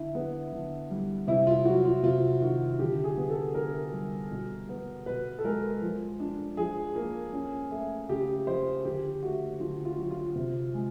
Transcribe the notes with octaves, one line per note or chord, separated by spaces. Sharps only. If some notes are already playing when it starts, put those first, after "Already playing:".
Already playing: D3 E4
B3
D3
G3
C3 E4
F4
F#3 F#4
F4
C3 F4
D#3 F#4
D3 G4
G#4
B3
A4
D3 A#4
G3
B2
B3
B2 B4
A4
G#3 A#4
F3
D4
F3 G#4
A#3
C#4
A3
C#3 G4
F3 C5
D3 G4
A3 F#4
D3 F4
F4
F#3
F4
C3
G#3